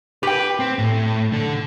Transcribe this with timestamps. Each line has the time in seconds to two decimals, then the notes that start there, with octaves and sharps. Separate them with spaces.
0.23 G4 B4 G5
0.60 C4
0.79 A2
1.32 D3 A4